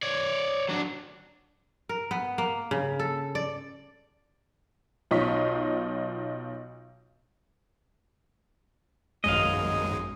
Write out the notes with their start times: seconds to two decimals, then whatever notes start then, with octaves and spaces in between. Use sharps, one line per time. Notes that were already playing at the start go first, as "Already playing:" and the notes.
0.03 C#5 D5
0.69 F#3 D4
1.89 A#4
2.11 B3
2.38 A#3
2.71 C#3
3.00 A4
3.35 D5
5.11 B1 D#4 F4 C#6 B6
9.24 G#1 F#2 G#3 D#5 F5